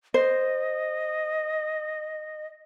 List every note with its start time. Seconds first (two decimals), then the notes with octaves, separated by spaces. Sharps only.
0.14 C5 D#5